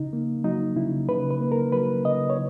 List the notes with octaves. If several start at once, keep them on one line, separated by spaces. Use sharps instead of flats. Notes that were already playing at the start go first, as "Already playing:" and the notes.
Already playing: C#3 D#4
A#3
F#3 D#4
C#3 E4
C#3 B4
B4
A#3
A#4
F#3 B4
C#3 D#5
C#5